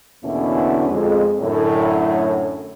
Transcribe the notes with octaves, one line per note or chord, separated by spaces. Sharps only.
E2 B2 D3 A#3 C#4 E4
F2 G#3
F#2 A2 D3